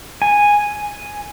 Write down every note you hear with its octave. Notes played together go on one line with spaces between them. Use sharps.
G#5